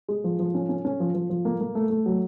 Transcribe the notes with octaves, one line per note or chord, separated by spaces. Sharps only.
G#3
F3
F3
C#4
C#4
C#4
F3
F3
F3
A#3
A#3
A3
A3
F#3